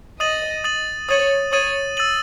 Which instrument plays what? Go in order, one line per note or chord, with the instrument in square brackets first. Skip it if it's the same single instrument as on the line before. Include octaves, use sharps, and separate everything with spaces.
[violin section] D#5 [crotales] D#6 A6 D#7 F#7
[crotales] D#6 A6 D#7 F#7
[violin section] C#5 [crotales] D#6 A6 D#7 F#7
[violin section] C#5 [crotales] D#6 A6 D#7 F#7
[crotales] E6 A6 D#7 F#7